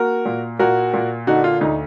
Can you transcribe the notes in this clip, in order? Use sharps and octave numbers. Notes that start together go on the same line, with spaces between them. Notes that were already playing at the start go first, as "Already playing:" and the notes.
Already playing: A#3 F#4 A#4
A#2
A#2 F#4 A#4
A#2
D3 D#4 F#4
F4
D2 D#4